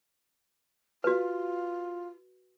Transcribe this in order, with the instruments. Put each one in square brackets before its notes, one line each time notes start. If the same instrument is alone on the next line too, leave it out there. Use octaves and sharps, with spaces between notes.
[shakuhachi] F4 [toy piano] F#4 B4